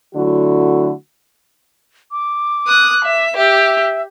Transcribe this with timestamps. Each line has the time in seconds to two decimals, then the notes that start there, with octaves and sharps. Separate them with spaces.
0.15 D3 F#3 A3 E4 F#4
2.11 D6
2.67 D#6 F#6
3.05 E5
3.37 G4 E5